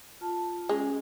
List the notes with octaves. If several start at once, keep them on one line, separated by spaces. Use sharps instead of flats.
F4 A5
G#3 C#4 G#4